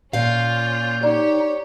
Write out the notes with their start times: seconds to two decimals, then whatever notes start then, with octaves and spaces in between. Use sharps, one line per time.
0.13 A#2 C#4 F4 F5 G6
1.03 D#4 G4 C#5 D5